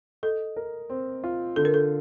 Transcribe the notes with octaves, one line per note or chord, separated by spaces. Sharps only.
A4 D#5
A#4
C4
F4
D3 A4
A#4
A4